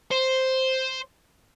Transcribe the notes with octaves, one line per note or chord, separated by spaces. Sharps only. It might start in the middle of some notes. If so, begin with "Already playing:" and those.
C5